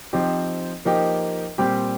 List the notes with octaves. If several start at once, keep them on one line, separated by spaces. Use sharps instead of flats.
F3 C4 D#4 G4
F3 A#3 D#4 G4
A#2 G3 C4 G4